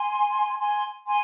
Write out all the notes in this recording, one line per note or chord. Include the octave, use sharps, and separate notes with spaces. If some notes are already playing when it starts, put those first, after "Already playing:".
Already playing: G#5 C6
G#5 C6
G#5 C6